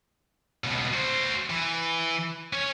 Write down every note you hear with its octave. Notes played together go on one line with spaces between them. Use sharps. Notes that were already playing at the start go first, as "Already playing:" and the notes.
C#2 B2
F#4 C5
E3
C#4 C#5